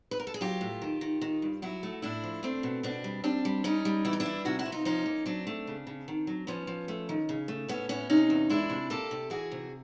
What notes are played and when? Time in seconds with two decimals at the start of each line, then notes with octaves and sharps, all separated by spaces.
0.11 B4
0.20 A#4
0.27 A4
0.34 G#4
0.41 F#3 F4 G4
0.61 A2
0.82 D#3
1.01 D#3
1.21 D#3
1.42 G2
1.62 F#3 E4 F#4
1.83 A3
2.02 A2 D4 E4
2.24 F3
2.43 A3 C4 D4
2.63 B2
2.83 B2 C4 D4
3.04 G3
3.24 G3 C4 D4
3.45 G3
3.64 G3 C#4 D#4
3.85 G3
4.05 E3 E4
4.13 D#4
4.20 D4 E4
4.26 G3
4.45 C3 E4 F#4
4.59 E4 F#4
4.66 C3
4.72 D#4 F4
4.85 F3 C#4 D#4
5.06 A#3
5.26 F#3 C4 D4
5.47 A3
5.67 C#3
5.87 C#3
6.08 D#3
6.27 F#3
6.47 F3 B3 C#4
6.67 F3
6.88 A3
7.09 D#3
7.29 C#3
7.48 A3
7.68 A2 B3 C#4
7.89 A2 B3 C#4
8.10 C3 C#4 D#4
8.30 E2
8.50 G#3 D4 E4
8.70 C3
8.90 A#3 G4 A4
9.11 C3
9.30 E3 F#4 G#4
9.51 C3